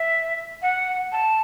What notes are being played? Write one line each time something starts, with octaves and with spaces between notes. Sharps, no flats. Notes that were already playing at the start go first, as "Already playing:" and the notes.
Already playing: E5
F#5
A5